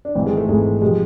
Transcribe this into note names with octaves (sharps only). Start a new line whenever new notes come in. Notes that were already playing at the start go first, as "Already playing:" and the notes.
D4
G#1 G#2 E3 C4
G#3
A3
G#1 G#2 E3 G#3
C3 F3 G#3